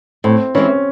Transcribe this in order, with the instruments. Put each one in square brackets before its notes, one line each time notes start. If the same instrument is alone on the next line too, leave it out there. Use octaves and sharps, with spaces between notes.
[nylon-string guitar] A2 [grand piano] C4
[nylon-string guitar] E3 G#3 C4 [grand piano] C#4